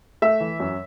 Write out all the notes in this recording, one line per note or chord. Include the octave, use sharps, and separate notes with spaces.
A3 E5
E3
F#2